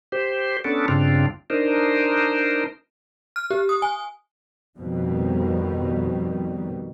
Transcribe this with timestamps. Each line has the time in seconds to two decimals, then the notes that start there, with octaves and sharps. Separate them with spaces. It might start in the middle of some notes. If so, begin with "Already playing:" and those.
0.12 G4 C5
0.64 B3 C#4 D4 A4
0.88 G2 C#3 C4 D4 F4
1.50 D4 D#4 A#4 C5
3.36 F6
3.51 G4
3.69 D#6
3.82 G#5
4.78 F2 B2 D#3 G3